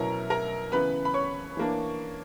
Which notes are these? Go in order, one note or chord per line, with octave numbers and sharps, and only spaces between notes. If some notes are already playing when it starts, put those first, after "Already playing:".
Already playing: B2 F#3 C#4 E4 A#4 A#5
A#4 A#5
C#3 E3 B3 B4 B5
B5
C#5 C#6
E3 A#3 D4